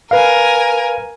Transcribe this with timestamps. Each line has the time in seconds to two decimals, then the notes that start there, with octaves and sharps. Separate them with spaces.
0.11 A#4 B4 F5 G#5